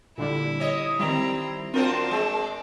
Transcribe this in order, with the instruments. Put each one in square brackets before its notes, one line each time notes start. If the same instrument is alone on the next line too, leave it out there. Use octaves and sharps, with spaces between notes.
[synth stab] A#2 D3 G3 [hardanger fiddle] E4
[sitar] C#5 D#5
[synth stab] D#3 G3 [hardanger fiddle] C4 A#5 [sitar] E4
[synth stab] C4 A#4 G5 [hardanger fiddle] D4 [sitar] F4 F#4 C5
[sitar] G#3